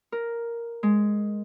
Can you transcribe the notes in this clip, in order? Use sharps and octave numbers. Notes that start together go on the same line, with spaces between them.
A#4
G#3